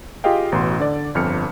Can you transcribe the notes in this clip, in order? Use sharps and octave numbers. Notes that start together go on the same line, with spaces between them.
F4 G4 G#4 D#5 F5 G5
A1 B2 F#4 C6
D3 D5
G1 F2 F6 C#7